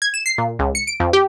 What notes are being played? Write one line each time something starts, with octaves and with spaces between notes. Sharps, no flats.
G#6
E7
C7
A#2
C#2
C#7
D7
F2
G4